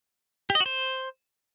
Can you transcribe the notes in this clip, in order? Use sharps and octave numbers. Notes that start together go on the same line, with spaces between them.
G4
D#5
F#4
C5